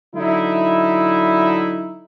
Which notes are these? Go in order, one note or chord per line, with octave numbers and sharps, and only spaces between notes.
D3 F#3 D#4 E4